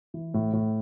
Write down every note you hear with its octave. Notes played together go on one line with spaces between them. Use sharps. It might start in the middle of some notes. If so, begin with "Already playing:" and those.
E3
A2
A2